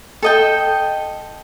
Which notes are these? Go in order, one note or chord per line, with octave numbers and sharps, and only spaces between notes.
A4 D#5 G5